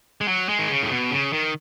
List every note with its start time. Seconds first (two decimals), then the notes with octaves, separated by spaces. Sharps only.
0.21 G#3
0.28 F#3
0.49 G#3
0.59 D#3
0.70 C#3
0.83 A2
0.91 B2
1.11 C#3
1.33 D#3